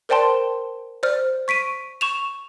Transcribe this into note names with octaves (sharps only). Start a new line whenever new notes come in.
A#4 C5 D5 G5 A5 C6
C5 D5 F6
C#6 B6 D7 D#7
C#6 E7 F7